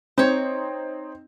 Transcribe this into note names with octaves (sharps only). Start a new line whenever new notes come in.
C4 D#4 C5 C#5